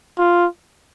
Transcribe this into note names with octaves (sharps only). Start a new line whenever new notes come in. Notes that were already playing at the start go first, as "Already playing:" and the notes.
F4